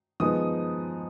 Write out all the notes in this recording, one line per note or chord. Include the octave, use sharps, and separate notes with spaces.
F3 G#3 B3 D#4 D#6